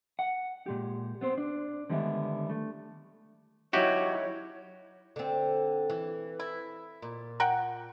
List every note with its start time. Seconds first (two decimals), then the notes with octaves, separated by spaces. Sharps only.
0.19 F#5
0.66 A#2 G#3 G4
1.21 B3 C4 C5
1.38 D4
1.90 D3 D#3 G3 G#3 B3 E4
2.50 A3
3.73 F#3 D#4 E4 F#4 G4 C#5
5.16 D3 C4
5.90 E3
6.40 E4
7.02 A#2
7.40 A#4 F#5 G5